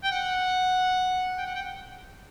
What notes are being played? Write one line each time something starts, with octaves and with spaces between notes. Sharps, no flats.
G5
F#5
G5
F#5
G5